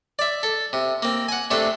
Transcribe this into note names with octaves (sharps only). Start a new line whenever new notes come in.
D5 E5
A4
C3
A#3 C4
F#5 G#5
C3 A3 D4 A4